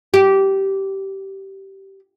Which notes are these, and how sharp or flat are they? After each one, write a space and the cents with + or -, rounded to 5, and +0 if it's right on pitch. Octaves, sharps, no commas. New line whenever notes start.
G4 -15